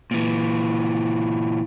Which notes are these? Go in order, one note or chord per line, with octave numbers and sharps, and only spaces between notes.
A#2 E3